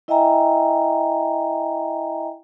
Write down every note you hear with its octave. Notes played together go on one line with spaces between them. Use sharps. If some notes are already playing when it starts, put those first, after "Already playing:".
E4 D#5 E5 G5 G#5 A#5